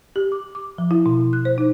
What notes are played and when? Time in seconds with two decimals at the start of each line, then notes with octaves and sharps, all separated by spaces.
0.16 G4
0.32 D6
0.55 D6
0.78 F3
0.91 E4
1.06 B2
1.33 F#6
1.45 C5
1.58 D#4